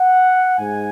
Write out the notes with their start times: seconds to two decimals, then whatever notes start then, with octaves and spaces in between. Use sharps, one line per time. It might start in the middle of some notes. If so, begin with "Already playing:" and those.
Already playing: F#5
0.59 G#2 G#3 G#5